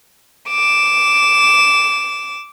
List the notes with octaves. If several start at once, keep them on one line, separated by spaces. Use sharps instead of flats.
D6 E7